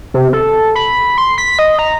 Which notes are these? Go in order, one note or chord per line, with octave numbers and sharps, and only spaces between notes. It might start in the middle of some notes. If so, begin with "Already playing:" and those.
C3
A4
B5
C6
B6
D#5
A#5